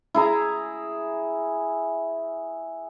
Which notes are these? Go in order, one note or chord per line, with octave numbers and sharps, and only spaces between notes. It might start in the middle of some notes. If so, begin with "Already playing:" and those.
E4 G#4 A#5